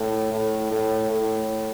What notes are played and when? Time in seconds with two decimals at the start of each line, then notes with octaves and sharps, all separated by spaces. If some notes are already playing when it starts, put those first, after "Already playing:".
Already playing: A2
0.32 A2
0.71 A2
1.11 A2